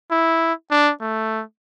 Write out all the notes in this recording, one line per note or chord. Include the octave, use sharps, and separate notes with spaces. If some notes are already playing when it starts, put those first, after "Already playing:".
E4
D4
A3